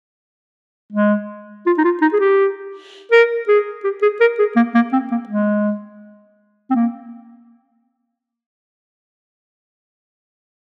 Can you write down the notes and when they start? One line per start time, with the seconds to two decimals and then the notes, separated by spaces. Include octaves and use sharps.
0.92 G#3
1.66 F4
1.78 D#4
1.85 F4
2.02 D#4
2.13 G#4
2.20 G4
3.12 A#4
3.48 G#4
3.84 G4
4.02 G#4
4.21 A#4
4.39 G#4
4.56 A#3
4.75 A#3
4.93 C4
5.11 A#3
5.29 G#3
6.70 C4
6.75 A#3